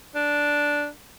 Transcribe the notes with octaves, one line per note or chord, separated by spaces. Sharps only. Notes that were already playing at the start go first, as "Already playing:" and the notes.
D4